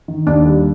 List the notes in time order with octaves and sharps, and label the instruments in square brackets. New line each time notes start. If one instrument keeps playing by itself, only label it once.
[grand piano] D#3
[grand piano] D#2 [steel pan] D4
[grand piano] G3